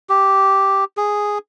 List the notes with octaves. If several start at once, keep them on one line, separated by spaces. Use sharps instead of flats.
G4
G#4